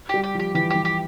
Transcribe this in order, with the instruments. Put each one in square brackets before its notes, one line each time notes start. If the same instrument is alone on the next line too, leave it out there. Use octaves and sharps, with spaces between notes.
[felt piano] G3 [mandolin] G4
[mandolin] G4
[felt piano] F3 [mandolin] G4
[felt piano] E3 [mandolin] G4
[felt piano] E3 [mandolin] G4
[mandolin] G4